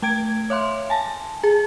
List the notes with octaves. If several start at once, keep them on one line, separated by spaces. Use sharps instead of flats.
A3 G5 G#6 D7
C#5 E5 F5 C6
G#5 A5
G#4